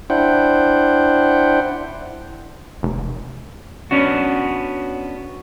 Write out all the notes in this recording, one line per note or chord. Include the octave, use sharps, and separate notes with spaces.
D4 E4 C5 F#5 G5
F1
B3 C#4 D4 F#4